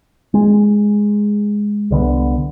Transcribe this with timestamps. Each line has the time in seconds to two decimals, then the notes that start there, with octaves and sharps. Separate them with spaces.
0.34 G#3
1.90 C2 D3 B3